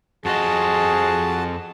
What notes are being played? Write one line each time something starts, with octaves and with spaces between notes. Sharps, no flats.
F2 F4 F#4 G#4 D#5 A5